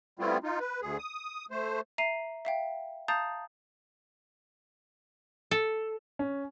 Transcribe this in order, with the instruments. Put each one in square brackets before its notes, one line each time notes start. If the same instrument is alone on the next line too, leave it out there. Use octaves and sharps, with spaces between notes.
[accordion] G3 A3 B3 C4 E4 F4
D#4 F4
B4
D2 G#4
D#6
A3 C5
[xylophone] E5 A#5 C7 D#7
E5 F5 G5
F5 A5 A#5 D#6 G6 A6
[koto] A4
[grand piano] C#4